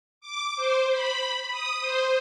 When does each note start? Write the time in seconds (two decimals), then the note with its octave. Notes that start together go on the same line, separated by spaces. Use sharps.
0.20 D6
0.56 C5
0.90 B5
1.50 D#6
1.80 C5